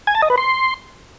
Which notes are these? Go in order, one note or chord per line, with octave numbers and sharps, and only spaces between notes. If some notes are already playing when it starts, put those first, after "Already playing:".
G#5
A5
D#5
B4
C6